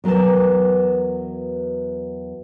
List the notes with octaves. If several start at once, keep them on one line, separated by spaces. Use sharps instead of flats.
E2 F#3 A#4 B4 A5